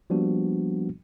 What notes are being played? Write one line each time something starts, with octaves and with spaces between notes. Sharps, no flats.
F3 G3 A#3 B3 D4 F#4